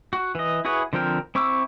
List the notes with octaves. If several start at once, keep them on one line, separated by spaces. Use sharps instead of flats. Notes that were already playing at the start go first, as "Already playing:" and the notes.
F#4
E3 D#5
E4 F#4 G#4 B4 C#5
D3 F3 C4 A#4 G5
C4 E4 C#6 D6 E6